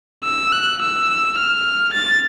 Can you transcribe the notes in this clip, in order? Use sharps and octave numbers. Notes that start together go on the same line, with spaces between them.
E6
F#6
E6
F6
A6